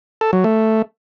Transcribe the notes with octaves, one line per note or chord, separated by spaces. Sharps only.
A4
F#3
A3